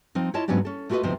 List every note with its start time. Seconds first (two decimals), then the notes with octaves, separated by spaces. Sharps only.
0.15 F3 C4 D#4
0.34 E4 F4 C#5 D#5 A5
0.48 G#2 F#3 B3 C#4 D4 G4
0.65 C#4 A4
0.90 A3 F4 F#4 A#4 B4 D#5
1.03 D2 C3 F3 B3 D#4 C5